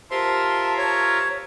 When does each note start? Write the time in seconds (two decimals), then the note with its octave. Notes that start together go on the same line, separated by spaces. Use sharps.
0.11 F4 G4 A#4 C5 E5 A5 C6
0.78 C#5